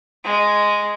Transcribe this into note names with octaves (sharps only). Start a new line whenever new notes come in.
G#3